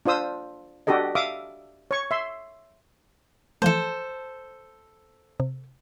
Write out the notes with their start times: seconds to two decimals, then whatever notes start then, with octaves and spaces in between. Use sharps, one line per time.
0.06 D4 F4 C5 D#6 E6
0.87 D4 F#4 G4 A4 D#5
1.15 E5 F5 D6 D#6
1.91 C#5 C#6
2.11 E5 C6
3.62 E3 F3 A3 A4 C5
5.40 C3